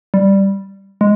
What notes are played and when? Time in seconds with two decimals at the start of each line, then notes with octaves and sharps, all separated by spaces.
0.14 G3
1.01 G#3